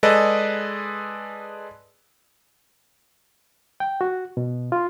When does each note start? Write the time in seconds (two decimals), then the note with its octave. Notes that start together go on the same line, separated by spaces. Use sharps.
0.03 G#3 G#4 A4 B4 D5 D#5
3.80 G5
4.01 F#4
4.37 B2
4.72 F4